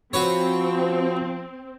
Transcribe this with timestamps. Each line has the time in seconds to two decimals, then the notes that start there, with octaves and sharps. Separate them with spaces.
0.13 F3 C4 F#4 B4 C#5